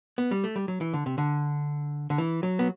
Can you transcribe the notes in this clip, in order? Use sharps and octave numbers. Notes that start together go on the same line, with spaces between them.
B3
G3
A3
G3
F#3
E3
D3
C3
D3
D3
E3
F#3
B3